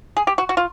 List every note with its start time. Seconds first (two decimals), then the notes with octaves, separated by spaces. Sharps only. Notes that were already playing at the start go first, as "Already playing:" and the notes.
0.17 G#4
0.27 G4
0.38 F#4
0.49 F#4
0.57 F4